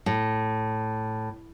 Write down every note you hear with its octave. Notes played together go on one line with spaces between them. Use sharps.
A2